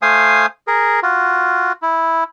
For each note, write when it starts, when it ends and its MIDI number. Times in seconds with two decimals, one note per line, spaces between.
0.02 0.46 57
0.02 0.46 72
0.02 0.46 77
0.02 0.46 80
0.02 0.46 87
0.67 1.00 68
0.67 1.00 70
1.03 1.72 65
1.03 1.72 66
1.82 2.24 64